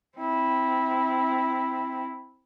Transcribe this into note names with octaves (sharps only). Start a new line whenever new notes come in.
C4 E4